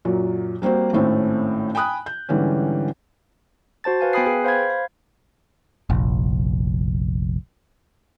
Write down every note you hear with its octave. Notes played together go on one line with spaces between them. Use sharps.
F#2 A#2 F#3
G3 A#3 C4 F#4 C5
G#1 A2 A3 C4 C#4
G5 G#5 B5 D#6 F#6
G6
G#2 D3 E3 G3 C#4
F#4 C5 A5 A6
B4 F5 G#5
B3 G5 G#5 B5 D#6 C7
G#4 B4 G5
C5 F5 B5 G#6
F5
F1 A#1